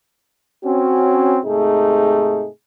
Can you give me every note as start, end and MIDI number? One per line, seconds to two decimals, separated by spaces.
0.65 1.39 60
0.65 1.39 61
0.65 1.39 66
1.45 2.47 44
1.45 2.47 48
1.45 2.47 57
1.45 2.47 63
1.45 2.47 68